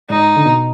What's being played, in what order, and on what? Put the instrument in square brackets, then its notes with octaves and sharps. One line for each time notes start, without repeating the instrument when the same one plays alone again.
[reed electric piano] G#2 [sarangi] D#4
[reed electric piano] D3
B2